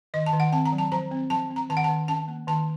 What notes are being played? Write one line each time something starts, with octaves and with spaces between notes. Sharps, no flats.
D#3 D#5
A5
D#3
F#5
C4 A5
A#5
F#3
A5
F3 A#5
C4
F3 A5
C4
A#5
D#3 A5
F#5
D#3 A5
C#4 A5
A#3
D#3 A5